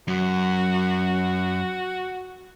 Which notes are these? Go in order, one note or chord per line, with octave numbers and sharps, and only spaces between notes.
F#2 F#4